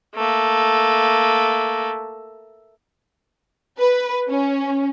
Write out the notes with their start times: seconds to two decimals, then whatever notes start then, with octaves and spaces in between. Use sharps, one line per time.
0.15 A3 A#3
3.79 B4
4.28 C#4